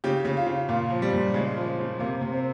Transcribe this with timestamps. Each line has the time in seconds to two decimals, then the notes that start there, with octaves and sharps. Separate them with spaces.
0.04 C#3 G4
0.25 C#3
0.37 F4
0.47 C#3
0.69 A#2 F4
0.90 F3
1.02 G3
1.13 A#2
1.34 C#3 G#3
1.56 F3
1.78 C#3
1.99 C3 A#3
2.21 C3
2.33 C4